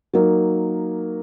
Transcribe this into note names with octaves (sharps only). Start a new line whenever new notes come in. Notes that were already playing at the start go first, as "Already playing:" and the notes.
F#3 A#3 D#4 A#4